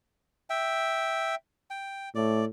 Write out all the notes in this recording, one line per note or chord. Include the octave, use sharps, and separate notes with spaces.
E5 G5
G5
A2 D5